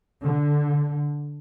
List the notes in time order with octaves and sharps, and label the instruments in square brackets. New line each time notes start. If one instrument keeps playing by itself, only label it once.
[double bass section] D3